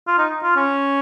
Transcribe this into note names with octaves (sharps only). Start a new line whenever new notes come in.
F4
D#4
F4
C#4